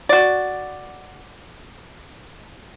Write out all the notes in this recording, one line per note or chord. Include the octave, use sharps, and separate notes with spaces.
F#4 D5